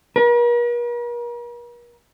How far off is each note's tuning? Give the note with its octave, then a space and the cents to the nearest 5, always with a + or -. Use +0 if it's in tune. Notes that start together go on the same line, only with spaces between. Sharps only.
A#4 +45